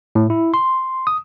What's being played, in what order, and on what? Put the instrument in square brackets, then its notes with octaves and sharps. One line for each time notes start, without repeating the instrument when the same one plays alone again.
[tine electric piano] A2
E4
C6
D#6